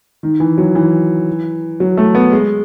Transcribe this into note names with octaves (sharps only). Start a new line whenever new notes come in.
D#3
E3
F#3
E3
F#3
A3
B3
G#3